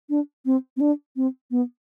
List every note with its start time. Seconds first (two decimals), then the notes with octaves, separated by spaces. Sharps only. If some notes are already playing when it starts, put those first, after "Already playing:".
0.10 D4
0.46 C4
0.77 C4
0.81 D4
1.16 C4
1.51 B3